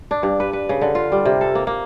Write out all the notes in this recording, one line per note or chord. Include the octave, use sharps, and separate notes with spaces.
D4
G2
B4
B4
C#3
D3
F4
G3
C3
A4
A#3
A#3